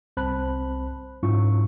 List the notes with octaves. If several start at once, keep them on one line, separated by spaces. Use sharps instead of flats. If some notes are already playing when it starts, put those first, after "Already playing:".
C2 C4 C5 A5 B5 F#6
G#2 F#3 C#4 E4 F4 C#6